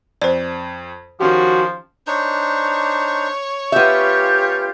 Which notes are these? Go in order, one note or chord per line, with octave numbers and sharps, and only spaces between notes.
F2 C5 D5
D#3 F3 C#4 F#4 G4
D4 D#4 C5 C#5
B3 C#4 F4 G4 E5 G6